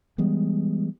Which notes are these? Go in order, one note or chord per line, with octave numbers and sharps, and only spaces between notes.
E3 G3 G#3 B3